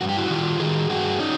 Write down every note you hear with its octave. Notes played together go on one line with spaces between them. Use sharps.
G2 F#4
G4
E4 F#4
D#3 F4 G4
D#3 F#4 G#4
G2 F#4 G#4
C#4 D#4